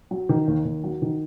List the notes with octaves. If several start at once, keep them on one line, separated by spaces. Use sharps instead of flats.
F#3
D#3
D#2
D#2
F#3
D#3